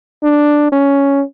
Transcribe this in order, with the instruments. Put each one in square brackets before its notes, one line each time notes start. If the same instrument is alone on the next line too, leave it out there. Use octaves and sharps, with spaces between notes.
[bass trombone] D4
C#4